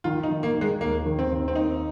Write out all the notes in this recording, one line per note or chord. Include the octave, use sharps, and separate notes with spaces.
D#3 F4
D#4
D#3
A#3
D#3
G#3
D#2 A#3
D#3
C4
D#2
C4
A#3 D#4